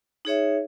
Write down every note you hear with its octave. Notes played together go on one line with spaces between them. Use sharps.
D#4 G#4 C#5 E5